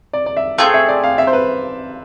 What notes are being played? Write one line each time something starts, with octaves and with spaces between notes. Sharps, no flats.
D5
D5
E5
A3 C4 G#4 F5
E5
D5
F5
E5
C5
B4